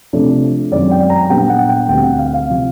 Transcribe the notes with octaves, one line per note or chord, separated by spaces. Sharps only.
C3 F3 A3 D4
F#2 D#3 G#3 C4 D5
G5
A#5
A#2 G3 B3 D4 G5
F#5
G5
D2 D3 G3 C4 G5
F#5
F5
F5
C3 F3